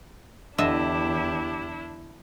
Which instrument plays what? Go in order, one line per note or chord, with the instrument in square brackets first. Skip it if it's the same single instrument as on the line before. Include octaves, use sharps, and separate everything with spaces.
[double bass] E2 [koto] D3 D#5 E5 [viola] D4 E4 [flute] G4